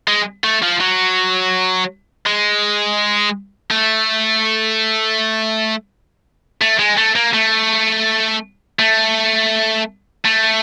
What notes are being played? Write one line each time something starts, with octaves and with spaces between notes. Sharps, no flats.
G#3
A3
F3
F#3
G#3
A3
A3
G#3
A3
A#3
A3
A3
A3